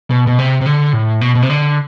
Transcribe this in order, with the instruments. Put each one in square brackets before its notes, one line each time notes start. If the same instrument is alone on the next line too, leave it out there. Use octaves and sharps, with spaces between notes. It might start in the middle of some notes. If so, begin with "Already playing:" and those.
[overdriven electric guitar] B2
B2
C3
C3
D3
A2
B2
B2
C3
D3